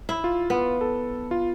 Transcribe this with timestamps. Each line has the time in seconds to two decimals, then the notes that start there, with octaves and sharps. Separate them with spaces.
0.09 E4
0.24 F4
0.50 B3
0.81 A4
1.31 F4